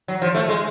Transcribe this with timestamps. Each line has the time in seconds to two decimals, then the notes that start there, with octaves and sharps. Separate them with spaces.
0.08 F#3
0.22 F3
0.34 A3
0.48 G#3